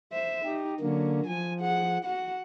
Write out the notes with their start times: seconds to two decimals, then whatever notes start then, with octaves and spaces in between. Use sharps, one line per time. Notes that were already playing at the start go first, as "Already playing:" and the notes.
0.12 C5 E5
0.45 D#4 G4
0.80 D3 F#3 A#3 C#4
1.27 F3 G#5
1.60 G#4 F#5
2.05 F#4 F#5